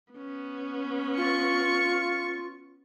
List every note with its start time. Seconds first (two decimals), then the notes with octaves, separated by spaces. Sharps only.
0.13 B3 C#4
1.17 F4 C#6